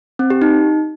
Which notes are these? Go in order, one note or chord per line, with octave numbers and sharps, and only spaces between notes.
C4
G4
D#4